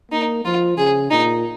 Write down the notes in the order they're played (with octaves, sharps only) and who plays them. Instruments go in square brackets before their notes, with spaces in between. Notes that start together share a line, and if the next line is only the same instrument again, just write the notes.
[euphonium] A#3 [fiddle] D#4
[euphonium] F3 [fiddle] F4
[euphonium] C#3 [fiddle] G#4
[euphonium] A#2 [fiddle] D#4